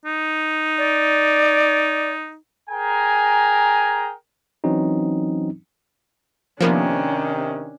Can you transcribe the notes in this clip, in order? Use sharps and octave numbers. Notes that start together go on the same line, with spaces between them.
D#4
D5
G#4 A#4 G5 G#5 A#5
E3 F#3 C4 C#4 D#4
C3 D#3 F3 A#3 B3 C#4 D4